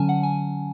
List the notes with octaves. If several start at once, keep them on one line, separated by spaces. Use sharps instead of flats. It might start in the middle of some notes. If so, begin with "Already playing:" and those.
Already playing: D3 F#3 C#4 G#5 A5
F#5
G#5